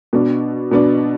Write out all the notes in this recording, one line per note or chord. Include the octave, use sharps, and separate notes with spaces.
B2 B3 D4
B2 B3 D4